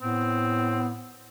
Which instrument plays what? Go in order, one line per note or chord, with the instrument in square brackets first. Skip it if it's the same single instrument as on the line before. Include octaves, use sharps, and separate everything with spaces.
[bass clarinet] A2 [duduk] B3 [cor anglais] C4